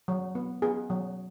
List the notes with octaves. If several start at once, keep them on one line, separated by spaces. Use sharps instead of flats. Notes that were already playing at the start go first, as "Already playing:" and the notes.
F#3
B3
B3 G#4
F#3